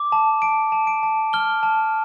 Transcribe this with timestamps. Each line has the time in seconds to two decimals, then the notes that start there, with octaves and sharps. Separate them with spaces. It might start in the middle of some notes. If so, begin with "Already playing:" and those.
Already playing: D6
0.12 A5
0.42 A5 D7
0.72 A5
0.87 D7
1.03 A5
1.33 F6 G7
1.63 A5